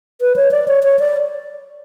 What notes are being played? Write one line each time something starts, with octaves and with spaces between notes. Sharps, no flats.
B4
C#5
D5
C#5
C#5
D5